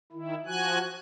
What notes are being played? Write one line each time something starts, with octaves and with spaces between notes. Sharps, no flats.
D#3 E4
F3 F#4 G#5 F#6